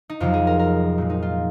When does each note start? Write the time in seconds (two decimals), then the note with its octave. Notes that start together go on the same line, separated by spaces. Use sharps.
0.10 D#4
0.20 F2 C3 F#3 F4
0.34 G#4
0.47 A#4
0.59 A#4
0.98 A#2 F3 G#3
1.10 D#4
1.22 F4